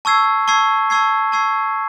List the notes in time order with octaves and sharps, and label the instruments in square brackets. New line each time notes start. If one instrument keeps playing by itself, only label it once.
[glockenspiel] A5 C#6 E6 G#6 C7
A5 C#6 E6 G#6 C7
A5 C#6 E6 G#6 C7
A5 C#6 E6 G#6 C7